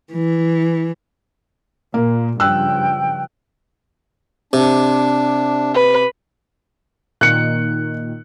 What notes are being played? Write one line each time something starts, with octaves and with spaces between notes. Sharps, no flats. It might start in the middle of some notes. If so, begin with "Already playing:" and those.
E3
A#2 A#3
G2 C#3 F3 G5 E6 F#6
C3 D4
B4
A#2 D#3 F#6 C#7